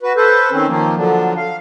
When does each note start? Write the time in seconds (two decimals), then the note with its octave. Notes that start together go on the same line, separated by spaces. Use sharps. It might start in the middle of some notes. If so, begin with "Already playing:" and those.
0.03 F#4 B4
0.17 A4 B4 C5
0.52 D#3 C4 C#4
0.67 D#3 F3 A#3
0.96 D3 F3 F#3 D4
1.37 F5